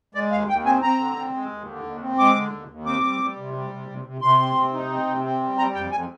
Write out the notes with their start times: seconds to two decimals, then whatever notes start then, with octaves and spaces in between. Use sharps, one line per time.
0.14 G#3 D5
0.31 D#2 F5
0.48 D#2 G5
0.65 C4 G#5
0.82 C4 A#5
0.99 D3
1.16 C4
1.34 G#3
1.51 D#2
1.67 D3
1.84 D#2
2.01 C4
2.18 G#3 D6
2.35 D3
2.52 D#2
2.69 D#2
2.86 C4 D6
3.04 G3
3.21 G3
3.37 C3
3.54 G3
3.70 C3
3.89 C3
4.05 C3
4.21 C3 C6
4.39 C4
4.55 C3
4.73 D#4
4.90 C4
5.07 C3
5.24 C4
5.41 G3
5.58 G3 A#5
5.74 F2 G5
5.91 F2 G#5